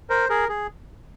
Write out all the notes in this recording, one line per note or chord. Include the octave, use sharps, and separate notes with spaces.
A#4 C5
G#4 A#4
G#4